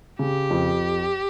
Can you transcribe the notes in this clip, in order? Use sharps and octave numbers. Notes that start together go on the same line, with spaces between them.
C#3 G4
F2